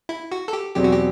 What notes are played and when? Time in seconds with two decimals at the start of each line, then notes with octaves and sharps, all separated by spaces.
0.09 E4
0.32 F#4
0.48 A4
0.53 G4
0.76 E2 B2 F#3 C4 G4
0.84 F#4
0.93 G4